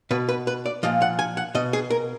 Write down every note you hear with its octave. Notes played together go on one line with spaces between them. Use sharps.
B2 B4
B4
B4
D5
A#2 F3 D#5
F#5
G#5
F#5
B2 D#5
G#4
A#4